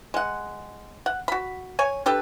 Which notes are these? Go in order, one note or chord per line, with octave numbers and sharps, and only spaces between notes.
G#3 F#5
F#5
F#4 B5
C#5 G#5
D4 G4 A4 B4